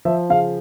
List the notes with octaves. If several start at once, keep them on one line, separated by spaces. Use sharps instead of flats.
F3 E5
C#3 F5